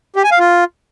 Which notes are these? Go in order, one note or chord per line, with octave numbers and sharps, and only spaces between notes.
G4
G#5
F5
F4